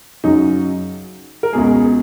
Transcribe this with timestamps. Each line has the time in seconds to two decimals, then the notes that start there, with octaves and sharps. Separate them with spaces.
0.24 F#2 C#3 F#3 D#4
1.43 A#4
1.53 C#2 B2 G#3 G#4